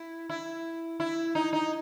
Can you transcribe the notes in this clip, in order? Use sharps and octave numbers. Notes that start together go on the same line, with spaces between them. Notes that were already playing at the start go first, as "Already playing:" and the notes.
Already playing: E4
E4
E4
D#4
D#4